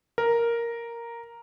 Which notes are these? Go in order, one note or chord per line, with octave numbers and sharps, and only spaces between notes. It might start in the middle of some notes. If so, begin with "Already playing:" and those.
A#4